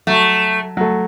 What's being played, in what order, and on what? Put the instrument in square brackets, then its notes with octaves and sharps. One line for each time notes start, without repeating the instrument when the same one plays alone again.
[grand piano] F#3 [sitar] A3
[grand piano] F#3
A3